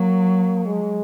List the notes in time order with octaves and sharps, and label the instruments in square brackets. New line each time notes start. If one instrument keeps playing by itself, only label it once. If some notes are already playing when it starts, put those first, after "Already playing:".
Already playing: [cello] F#3 [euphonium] A#3
[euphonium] G#3